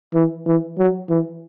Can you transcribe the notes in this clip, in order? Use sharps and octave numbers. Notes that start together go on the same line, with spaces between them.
E3
E3
F#3
E3